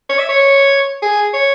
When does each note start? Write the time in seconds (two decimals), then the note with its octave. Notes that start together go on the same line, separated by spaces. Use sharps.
0.09 C#5
0.19 E5
0.29 C#5
1.02 G#4
1.33 C#5